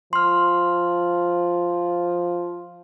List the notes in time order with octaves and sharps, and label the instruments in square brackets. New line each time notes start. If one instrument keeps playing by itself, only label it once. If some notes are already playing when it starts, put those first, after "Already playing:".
[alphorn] F3 [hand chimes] C6 F6